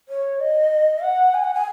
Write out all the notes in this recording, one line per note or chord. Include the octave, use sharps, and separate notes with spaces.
C#5
D#5
F#5
G#5
F#5
G#5